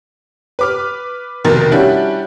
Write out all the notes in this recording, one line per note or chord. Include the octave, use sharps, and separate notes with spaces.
B4 D6 F6
F1 B2 D#3 A#4 A6
G3 C#4 D4 E4 F#4 G4